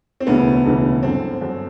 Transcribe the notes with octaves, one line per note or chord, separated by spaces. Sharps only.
C4
E1 D2 C#3 E3 B3
E1 D2 C#3 E3
G1 F#2 D3 C4
G1 F#2 D3